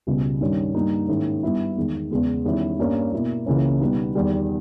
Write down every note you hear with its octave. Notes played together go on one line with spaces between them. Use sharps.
C#2 B2 G3
G2 D#3 G3 C#4
G2 G3 A#3 D#4
G#2 D#3 A#3 C#4 E4
G2 G3 B3 E4
E2 D#3 G#3
E2 C#3 G#3 B3
E2 D#3 G3 C#4 E4
G2 G3 A#3 C#4
B2 A#3 E4
C#2 C#3 E3 A#3 C#4
B2 G3 B3 D#4
E2 D#3 G3